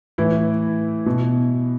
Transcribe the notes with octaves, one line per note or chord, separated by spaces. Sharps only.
A2 E3 E4
B2